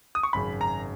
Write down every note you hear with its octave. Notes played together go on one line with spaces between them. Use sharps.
D#6
C#6
G#1 F#2 C#3 B5
A#5